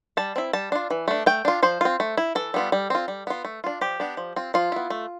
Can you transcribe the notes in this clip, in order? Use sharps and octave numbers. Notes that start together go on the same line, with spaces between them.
G3 A5
C4 E4
G3 A5
D4 F4
E3
A3 D4
A3 G5
D4 F4
F3 C5
C4 F4
A3
E4
E3 A4
G3 B3 F4
G3
C4 F4
G3
B3 F4
A3
D4 F4
F3 G4
B3 D4
F3
C4 F4
F3 F4
B3 E4
A3